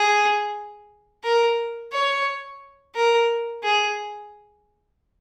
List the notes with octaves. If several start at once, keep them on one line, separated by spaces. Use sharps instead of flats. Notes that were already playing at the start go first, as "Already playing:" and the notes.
Already playing: G#4
A#4
C#5
A#4
G#4